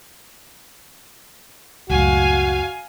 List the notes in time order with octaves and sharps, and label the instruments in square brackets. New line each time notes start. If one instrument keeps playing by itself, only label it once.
[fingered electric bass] C#2 F#2 A2 [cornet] F#4 [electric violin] F5 G#5